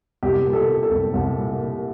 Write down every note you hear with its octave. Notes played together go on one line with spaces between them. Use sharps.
C2 G4
A#2
A4
A#2
A4
C2
C2
A#2
A#2